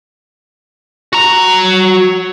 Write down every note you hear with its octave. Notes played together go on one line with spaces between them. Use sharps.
F#4 A#5